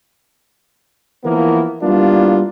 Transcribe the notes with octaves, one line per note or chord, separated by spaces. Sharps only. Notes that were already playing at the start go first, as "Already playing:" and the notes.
E3 F3 A#3 B3 E4 A#4
G3 A#3 B3 D4 E4 F4